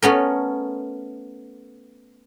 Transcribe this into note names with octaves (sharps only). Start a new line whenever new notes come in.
A3 B3 C#4 A#4